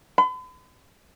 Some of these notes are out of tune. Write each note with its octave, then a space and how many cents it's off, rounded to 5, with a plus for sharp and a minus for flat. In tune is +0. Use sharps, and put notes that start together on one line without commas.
B5 +45